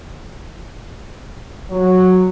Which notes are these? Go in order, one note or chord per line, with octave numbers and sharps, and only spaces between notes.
F#3